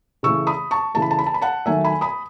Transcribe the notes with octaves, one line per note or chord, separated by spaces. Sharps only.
C#3 E3 A3 C#6 E6
B5 D#6
A5 C#6
C#3 E3 A3 A5
B5
A5
B5
A5
B5
F#5 A5
D#3 F#3 A3 E5 G#5
G#5 B5
B5 D#6